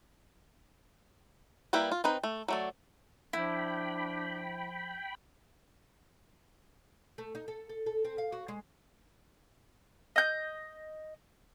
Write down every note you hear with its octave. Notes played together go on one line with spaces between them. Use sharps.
G3 A#3 E4 G4 B4
F4
C4 D#4 B4
A3
F#3 A3 D5
F3 D4 E4 G5 B5
A3
D#4
A4
A4
A4
C4
F5
F#4
G#3
D#5 G6